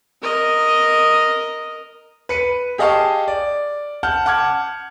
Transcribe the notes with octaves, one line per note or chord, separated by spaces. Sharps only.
A#4 D#5
B4 C#7 D#7
G4 G#4 D#5 F5 A5 C#6
D5
F#5 A5 F6 G6
F#5 A5 D6 F6 G#6